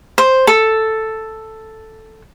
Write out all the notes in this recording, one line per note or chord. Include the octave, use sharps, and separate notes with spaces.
C5
A4